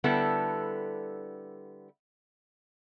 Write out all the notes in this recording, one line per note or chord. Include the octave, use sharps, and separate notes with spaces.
D3 G3 B3 E4 A4